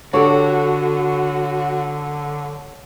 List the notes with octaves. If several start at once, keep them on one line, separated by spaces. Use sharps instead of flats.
D3 D4 F#4 G4 A4 C#5